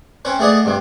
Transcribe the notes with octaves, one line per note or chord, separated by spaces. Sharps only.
C4 C#4 B4
A3 B3 G#4 D5 D#5
G2 C3